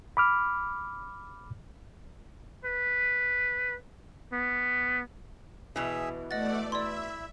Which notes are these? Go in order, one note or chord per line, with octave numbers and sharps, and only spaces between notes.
B5 D6 F6
B4
B3
B2 E3 G#4 E5
A3 D5 D#5 F#5 A6
E4 D5 E5 C6